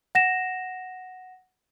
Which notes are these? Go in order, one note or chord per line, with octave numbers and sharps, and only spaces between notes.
F#5 A#6 E7